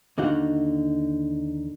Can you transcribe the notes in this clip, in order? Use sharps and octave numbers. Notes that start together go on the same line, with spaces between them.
D#2 D3 D#4 F#4 F5